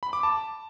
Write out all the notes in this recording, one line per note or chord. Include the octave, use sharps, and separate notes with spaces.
B5
D6
A5